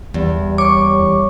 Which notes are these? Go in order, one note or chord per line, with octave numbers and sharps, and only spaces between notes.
E2 G3
C#5 C#6 D6